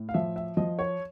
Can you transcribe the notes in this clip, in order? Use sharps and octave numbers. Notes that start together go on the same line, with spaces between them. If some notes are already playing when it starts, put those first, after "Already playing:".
Already playing: A2
F5
F3 E5
E5
F3 D#5
C#5